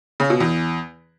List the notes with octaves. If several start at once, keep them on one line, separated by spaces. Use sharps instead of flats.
C#3
B2
E2